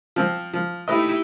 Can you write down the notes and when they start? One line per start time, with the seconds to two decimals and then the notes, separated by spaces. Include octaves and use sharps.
0.16 F3 C4
0.53 F3
0.88 A3 D#4 E4 G4 B4 D#5